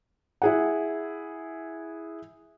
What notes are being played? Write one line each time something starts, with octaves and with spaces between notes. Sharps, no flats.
E4 G#4 F#5